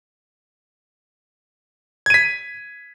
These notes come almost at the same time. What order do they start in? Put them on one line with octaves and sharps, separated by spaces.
G#6 D#7 B6